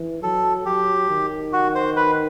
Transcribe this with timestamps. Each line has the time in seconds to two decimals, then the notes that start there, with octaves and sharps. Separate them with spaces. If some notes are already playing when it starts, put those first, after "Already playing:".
Already playing: E3
0.23 F#3 A4
0.66 F#3 G4
1.09 D#3
1.53 F#4
1.75 C5
1.96 B4